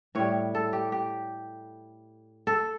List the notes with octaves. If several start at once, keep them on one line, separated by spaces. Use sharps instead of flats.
A2 G3 C#5
A4
G4
G4
A4